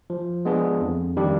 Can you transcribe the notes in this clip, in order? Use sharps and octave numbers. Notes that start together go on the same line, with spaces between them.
F3
G#3 B3 D4 G#4
F2
D#3 G3 D4 G4